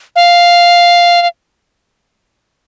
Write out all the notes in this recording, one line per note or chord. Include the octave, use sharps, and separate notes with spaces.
F5
F5